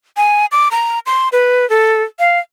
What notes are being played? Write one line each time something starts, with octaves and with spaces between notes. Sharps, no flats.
G#5
D6
A#5
C6
B4
A4
F5